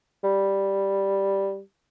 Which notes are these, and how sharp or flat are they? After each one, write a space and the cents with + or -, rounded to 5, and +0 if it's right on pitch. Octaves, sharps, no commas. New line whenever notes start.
G3 +0